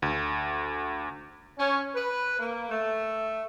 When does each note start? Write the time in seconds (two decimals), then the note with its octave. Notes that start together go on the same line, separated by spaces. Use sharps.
0.02 D2
1.58 C#4
1.95 B4
2.39 A#3
2.69 A3